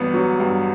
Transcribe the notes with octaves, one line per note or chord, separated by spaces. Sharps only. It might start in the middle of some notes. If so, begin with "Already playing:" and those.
Already playing: A1 G2 F#3 B3
F#3
G2